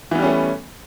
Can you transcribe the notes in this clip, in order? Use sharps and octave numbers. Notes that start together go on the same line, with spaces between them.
E3 G3 A3 B3 C#4